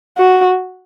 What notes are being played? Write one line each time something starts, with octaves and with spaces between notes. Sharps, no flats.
F#4